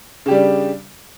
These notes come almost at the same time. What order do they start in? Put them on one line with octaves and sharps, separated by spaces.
C#3 G4 G3 D4